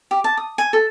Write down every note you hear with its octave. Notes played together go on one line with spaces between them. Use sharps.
G4
A5
D#6
G#5
A4